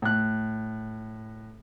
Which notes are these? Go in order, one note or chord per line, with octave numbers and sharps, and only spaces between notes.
A2 F#6